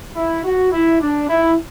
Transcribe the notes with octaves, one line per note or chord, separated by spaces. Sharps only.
E4
F#4
E4
D4
E4